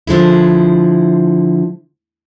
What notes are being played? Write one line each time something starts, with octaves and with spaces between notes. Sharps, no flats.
D3 F3 G#3 E4